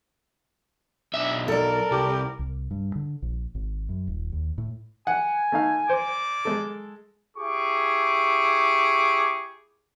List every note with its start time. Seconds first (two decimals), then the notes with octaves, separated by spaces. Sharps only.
1.14 B1 D4 E5
1.48 A4 A#4 D5
1.91 C2 G4
2.39 C2
2.71 G2
2.96 D3
3.22 A#1
3.55 G#1
3.89 F#2
4.07 D#1
4.32 D#2
4.58 A2
5.07 F#5 G#5
5.52 A3 D#4 F5
5.89 A#3 C5 D5 D6
6.45 G#3 A4
7.37 E4 G4 G#4 C#6 D6